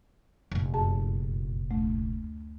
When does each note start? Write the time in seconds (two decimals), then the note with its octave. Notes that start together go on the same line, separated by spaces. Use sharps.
0.52 F1 A#2
0.74 F#2 G#4 A5
1.71 D2 A3